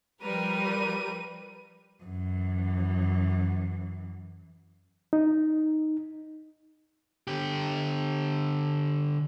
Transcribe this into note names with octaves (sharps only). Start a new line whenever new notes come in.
F3 G3 A#4 B4 D#7
F#2 E3
D#4
D3 G4